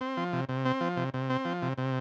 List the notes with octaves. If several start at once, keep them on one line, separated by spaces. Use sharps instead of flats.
C4
F3
C3
C3
C4
F3
C3
C3
C4
F3
C3
C3